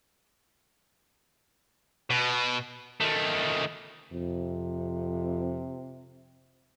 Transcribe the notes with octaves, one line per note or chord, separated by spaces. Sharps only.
B2
D#3 A3
F2 C3